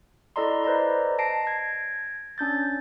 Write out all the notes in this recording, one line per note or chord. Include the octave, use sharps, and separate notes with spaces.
E4 A4 D5 D#5 A#5 C6
B4 C5 D5 D#5 A#5
A5 A#6 C7 D7
G#6 A#6
C#4 D4 G6 A6